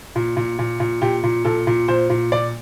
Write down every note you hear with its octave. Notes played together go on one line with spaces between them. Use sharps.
A#2
A#2
A#2
A#2
A#2 G4
A#2
A#2 A4
A#2
A#2 C5
A#2
A#2 D5